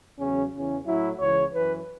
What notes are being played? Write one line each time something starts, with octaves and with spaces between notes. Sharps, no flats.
E2 C#3 F#3 C#4
E2 C#3 E3 C#4
A2 F#3 E4
C#2 C#3 E3 C#5
F#2 E3 B4